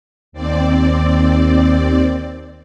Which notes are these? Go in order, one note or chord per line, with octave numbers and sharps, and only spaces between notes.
D#2 C4 D5